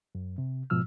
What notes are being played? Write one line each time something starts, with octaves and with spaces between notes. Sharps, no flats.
F#2
C3
G#2 B2 F3 E6 F6